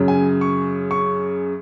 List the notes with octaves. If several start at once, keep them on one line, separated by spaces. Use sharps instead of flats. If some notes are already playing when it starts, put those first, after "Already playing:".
Already playing: F#2 C#3
G#5
C#6
C#6